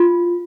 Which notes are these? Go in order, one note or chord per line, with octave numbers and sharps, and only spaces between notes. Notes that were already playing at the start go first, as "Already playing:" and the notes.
Already playing: F4